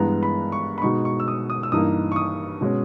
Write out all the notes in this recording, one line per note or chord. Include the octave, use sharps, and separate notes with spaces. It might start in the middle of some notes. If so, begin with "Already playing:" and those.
Already playing: G2 E3 G#3 B3 A#5
B5
C#6
B5
B2 G#3 D#4 C#6
C#6
E6
D#6
D#6
E6
G2 E3 A#3 D#4 D#6
C#6
D#6
B2 G#3 C#4